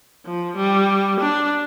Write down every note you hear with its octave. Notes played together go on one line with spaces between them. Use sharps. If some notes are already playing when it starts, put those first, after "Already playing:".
F3
G3
D4